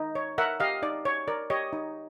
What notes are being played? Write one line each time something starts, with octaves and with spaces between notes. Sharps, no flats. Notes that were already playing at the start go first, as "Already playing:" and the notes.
Already playing: D#4
C#5
A#4 E5 F#5
G4 D#5 F5
D#4 D5
C#5
A#4 D5
G4 C#5 D#5
D#4